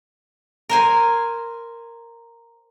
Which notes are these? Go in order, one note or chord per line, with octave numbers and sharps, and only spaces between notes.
A#4 C5 G#5